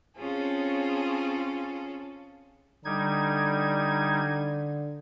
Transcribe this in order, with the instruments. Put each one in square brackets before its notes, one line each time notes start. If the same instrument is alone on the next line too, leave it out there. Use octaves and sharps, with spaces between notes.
[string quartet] C4 C#4 F4 G#4 A4
[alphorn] D3 [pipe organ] G3 D#4 G#6